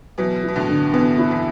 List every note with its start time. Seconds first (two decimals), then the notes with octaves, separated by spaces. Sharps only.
0.18 B2 E3 F#3
0.43 E4
0.49 B2
0.56 A2 D3
0.69 D3
0.93 B2 E3 B3
1.18 E4
1.31 B2 E3